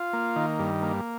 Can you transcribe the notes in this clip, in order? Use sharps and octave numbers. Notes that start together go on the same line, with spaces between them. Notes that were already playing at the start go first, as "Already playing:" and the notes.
Already playing: F4
A#3
D#3
G2
A#3